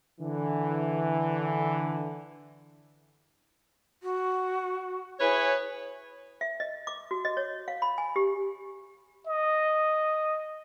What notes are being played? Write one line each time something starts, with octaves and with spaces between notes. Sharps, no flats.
D3 E3
F#4
E4 G#4 B4 C#5
E5
D#5
D6
F#4
D#5
C#5
F5
B5
G#5
G4
D#5